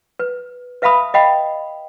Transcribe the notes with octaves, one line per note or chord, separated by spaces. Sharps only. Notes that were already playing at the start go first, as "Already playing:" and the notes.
B4
B4 E5 F5 A5 B5 D#6
D#5 F5 G5 B5